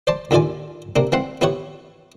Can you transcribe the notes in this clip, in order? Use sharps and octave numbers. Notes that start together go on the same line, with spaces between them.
C5 D5 A5
D#2 D3 E4 F4 D5 G#5
C3 A#3 D4
E3 C4 F5 F#5
B3 E4 G4 C#5 F#5